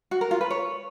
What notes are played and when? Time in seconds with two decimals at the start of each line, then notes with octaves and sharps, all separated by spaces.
0.11 F#4
0.21 A#4
0.31 F4
0.41 B4
0.51 C#5